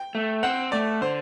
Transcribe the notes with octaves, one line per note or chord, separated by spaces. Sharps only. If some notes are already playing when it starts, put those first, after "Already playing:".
Already playing: G5
A3
C4 F#5
A3 D5
D3 C5